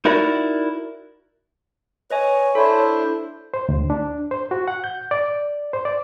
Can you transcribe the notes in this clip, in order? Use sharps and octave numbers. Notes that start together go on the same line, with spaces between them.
D#4 E4 F#4 A#4 D5
B4 C#5 D#5 G#5
D4 E4 A4 C5
C5
D2
D4
C5
F#4
F#5
G6
D5
C5
D5